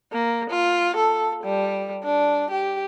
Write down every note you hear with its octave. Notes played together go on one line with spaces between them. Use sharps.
A#3
F4
A4
G3
D4
G4